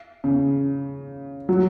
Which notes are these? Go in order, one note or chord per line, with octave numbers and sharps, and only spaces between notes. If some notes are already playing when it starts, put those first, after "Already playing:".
C#3
F#3